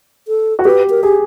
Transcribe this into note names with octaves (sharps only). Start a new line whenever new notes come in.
A4
F#4
G4 B4
A#4
G4 G#4